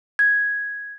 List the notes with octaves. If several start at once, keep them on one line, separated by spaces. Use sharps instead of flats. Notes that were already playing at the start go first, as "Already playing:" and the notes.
G#6